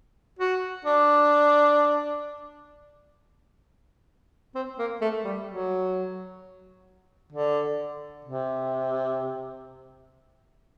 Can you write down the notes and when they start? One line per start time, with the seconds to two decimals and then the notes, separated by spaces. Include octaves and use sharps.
0.39 F#4
0.85 D4
4.55 C4
4.79 A#3
5.01 A3
5.25 G3
5.48 F#3
7.32 D3
8.25 C3